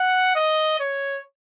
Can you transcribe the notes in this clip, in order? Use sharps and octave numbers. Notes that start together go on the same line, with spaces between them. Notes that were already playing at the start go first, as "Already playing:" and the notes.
Already playing: F#5
D#5
C#5